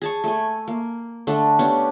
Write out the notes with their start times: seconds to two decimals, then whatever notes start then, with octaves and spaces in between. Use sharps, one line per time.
0.02 G#4 A5 C#6
0.24 A3 G#5
0.68 A#3
1.27 D3 A3 D4
1.59 B3 C#4 D4 G4